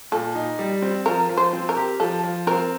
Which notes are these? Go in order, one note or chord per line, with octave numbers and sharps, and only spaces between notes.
A#2 A4
D#4
G3
C4
F3 A#4
F3
C5
C4
A#4
G4
F3 A4
F3
C4 A#4